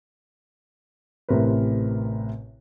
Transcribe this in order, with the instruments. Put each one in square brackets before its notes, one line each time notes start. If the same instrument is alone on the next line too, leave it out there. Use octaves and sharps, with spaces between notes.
[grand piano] A1 A2 C3 C4 A#4 B4